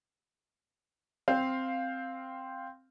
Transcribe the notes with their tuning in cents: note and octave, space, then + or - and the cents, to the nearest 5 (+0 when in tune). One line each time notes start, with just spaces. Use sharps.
C4 +0 F5 +0